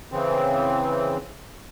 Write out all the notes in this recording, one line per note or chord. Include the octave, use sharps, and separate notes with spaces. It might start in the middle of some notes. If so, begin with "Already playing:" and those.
C#3 E3 C4